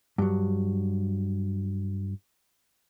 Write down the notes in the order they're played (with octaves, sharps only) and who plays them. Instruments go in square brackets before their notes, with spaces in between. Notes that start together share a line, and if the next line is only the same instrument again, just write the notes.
[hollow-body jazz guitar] G2 F#3